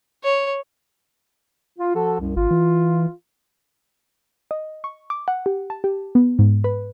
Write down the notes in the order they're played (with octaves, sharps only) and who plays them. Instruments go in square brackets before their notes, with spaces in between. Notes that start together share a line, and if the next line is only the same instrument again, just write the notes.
[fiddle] C#5
[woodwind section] F4
F3 F#4 A4
C2 F#2
[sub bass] G#1 [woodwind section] F4
[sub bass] E3
[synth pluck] D#5
C#6
D6
F#5
G4
A5
G4
B3
G#2
B4